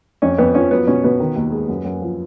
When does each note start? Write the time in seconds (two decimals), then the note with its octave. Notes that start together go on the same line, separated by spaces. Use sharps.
0.22 F2 C#4
0.38 F2 B3
0.55 F3 C#4
0.71 F#3 B3
0.87 B2 C#4
1.04 B2 B3
1.20 D#3
1.36 D#2
1.52 G#3
1.68 F#2
1.85 F#2
2.02 F3